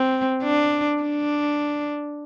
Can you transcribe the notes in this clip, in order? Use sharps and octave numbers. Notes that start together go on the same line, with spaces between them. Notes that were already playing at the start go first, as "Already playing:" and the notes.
Already playing: C4
D4
D4